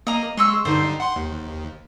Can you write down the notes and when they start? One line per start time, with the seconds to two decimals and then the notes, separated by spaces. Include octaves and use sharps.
0.07 A#3 D#5 A#5
0.37 G#3 C6 C#6 E6
0.65 G2 D3 D#4 C5
1.00 F#5 C6
1.16 D#2